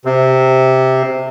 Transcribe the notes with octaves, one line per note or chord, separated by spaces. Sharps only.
C3